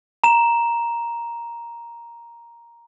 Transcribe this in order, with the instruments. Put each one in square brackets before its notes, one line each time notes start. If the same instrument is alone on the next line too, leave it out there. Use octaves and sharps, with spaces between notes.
[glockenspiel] A#5 E7